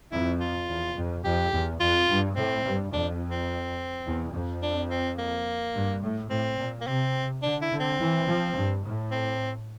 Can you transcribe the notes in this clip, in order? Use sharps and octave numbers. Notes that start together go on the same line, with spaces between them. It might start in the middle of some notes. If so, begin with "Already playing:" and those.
F2 E4
F4
E2
F2
F2 G4
E2
F2 F4
G2
A2 C4
G2
F2 D4
C4
E2
F2
D4
C4
A#3
G2
A2
A2 C4
A#2
A#3
C3 C4
D3 D4
E4
D3
C4
E3
F3
G2
A2
C4